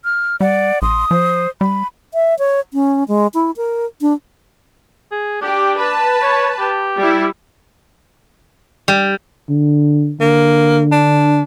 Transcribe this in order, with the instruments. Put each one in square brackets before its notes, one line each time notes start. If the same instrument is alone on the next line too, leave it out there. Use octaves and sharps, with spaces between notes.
[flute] F6
[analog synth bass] G3 [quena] D5 [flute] F#5
[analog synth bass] A#1 [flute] C6 [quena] D#6
[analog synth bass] F3 [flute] C5
[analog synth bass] G3 [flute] B5
[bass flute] E5
C#5
C#4
G#3
E4
A#4
D4
[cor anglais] G#4
[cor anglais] D4 [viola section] G4
[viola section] B4 A5
[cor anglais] C#5
G4
[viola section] G3 E4
[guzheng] G3
[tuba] D3
[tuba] D3 [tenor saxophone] A#3
[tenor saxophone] D4